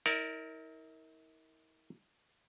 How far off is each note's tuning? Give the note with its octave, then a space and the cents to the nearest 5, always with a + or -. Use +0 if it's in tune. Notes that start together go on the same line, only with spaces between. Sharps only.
E4 -45 A#4 -5 D5 +0